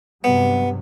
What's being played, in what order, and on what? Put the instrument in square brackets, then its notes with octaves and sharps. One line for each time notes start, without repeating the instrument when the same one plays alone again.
[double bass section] G2 C3 F#3 [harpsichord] B3